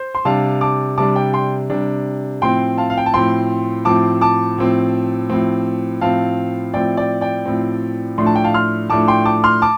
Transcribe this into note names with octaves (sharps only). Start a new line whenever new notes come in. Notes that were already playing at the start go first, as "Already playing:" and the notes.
Already playing: C5
C6
C3 G3 D4 F5 A5
A5 D6
C3 G3 D4 A5 D6
D5 G5
G5 C6
C3 G3 D4
A2 F3 C4 G5 C6
F5 A5
F5
G5
A5
A2 F3 C4 G5 C6
A2 F3 C4 A5 D6
A5 D6
A2 F3 C4
A2 F3 C4
A2 F3 C4 F5 A5
A2 F3 C4 D5 G5
D5 G5
D5 G5
A2 F3 C4
A2 F3 A3 D4 C6
A5
G5
F5 A5
C6 F6
A2 F3 A3 D4 A5 D6
G5 C6
A5 D6
C6 F6
A5 D6